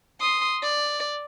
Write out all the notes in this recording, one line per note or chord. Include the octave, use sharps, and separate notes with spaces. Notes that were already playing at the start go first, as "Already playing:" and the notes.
C6 D#6
D5